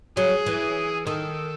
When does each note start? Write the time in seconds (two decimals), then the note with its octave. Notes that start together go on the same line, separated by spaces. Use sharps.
0.16 F#3 G#4
0.46 E3
1.07 D#3 A4